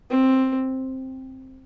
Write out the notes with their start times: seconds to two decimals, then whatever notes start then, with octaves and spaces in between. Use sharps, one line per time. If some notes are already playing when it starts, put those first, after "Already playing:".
0.10 C4